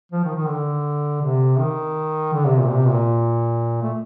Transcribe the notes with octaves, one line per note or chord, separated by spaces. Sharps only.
F3
D#3
D#3
D3
C3
D#3
D3
C3
A#2
C3
A#2
A3